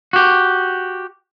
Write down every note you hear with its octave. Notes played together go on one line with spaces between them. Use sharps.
F#4 G4